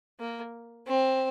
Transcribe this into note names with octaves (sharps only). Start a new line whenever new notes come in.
A#3
C4